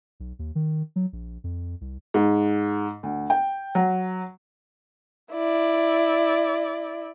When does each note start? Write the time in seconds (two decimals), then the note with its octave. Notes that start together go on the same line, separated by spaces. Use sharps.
0.20 B1
0.39 D#2
0.55 D#3
0.96 F#3
1.13 A#1
1.44 F2
1.81 C2
2.14 G#2
3.03 D2
3.30 G5
3.75 F#3
5.32 E4 D5